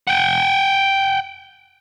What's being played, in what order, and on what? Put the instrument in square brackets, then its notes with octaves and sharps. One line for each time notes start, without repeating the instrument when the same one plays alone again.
[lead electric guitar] F#5 G5